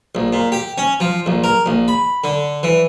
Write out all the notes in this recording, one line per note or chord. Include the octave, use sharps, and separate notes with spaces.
A#1
A#2
G4
C#4
F3
A#1
A#4
A#1
B5
D3
E3